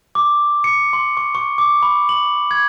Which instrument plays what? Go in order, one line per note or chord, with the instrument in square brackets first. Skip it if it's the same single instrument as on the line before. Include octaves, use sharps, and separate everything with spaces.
[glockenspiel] D6
C#7
C6
C#6
C#6
D6
B5
F#7
G#6